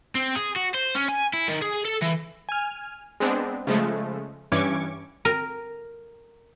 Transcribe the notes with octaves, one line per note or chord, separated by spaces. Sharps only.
C4
G#4
F#4
C5
C#4
G#5
E4
D#3
G#4
A4
E3
G#5 F6
G#3 B3 C4 D4
C#3 F3 G#3 A3
G2 E3 C#4 D6 G#6 C#7
A#4